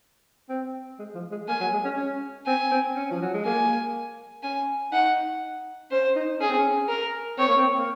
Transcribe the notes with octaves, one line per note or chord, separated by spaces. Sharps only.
C4
G#3
F3
G#3
A#3 G#5
F#3
G#3
C#4
C#4
C4 G#5
C4
C#4
F3
F#3
G#3
A#3 G#5
C#4 G#5
D#4 F#5
C#4 C5
D#4
C#4 G#4
C4
C#4
A#4
C4 C#5
A#3
C4
A#3